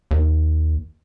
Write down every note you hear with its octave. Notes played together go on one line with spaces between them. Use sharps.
D#2